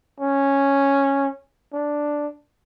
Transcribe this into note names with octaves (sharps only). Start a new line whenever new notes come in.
C#4
D4